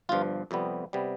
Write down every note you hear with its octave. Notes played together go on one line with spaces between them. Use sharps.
G1 G2 F3 F4
F2 C3 G3 B3
C3 G3 B3